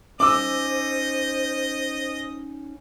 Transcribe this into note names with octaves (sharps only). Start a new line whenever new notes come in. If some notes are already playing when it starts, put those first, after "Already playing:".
C#4 D#4 C5 D#5 D6 E6